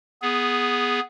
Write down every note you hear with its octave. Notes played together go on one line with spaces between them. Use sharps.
B3 G#4